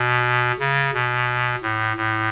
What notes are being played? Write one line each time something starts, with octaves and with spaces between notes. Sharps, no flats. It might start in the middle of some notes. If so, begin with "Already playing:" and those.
Already playing: B2
C#3
B2
A2
A2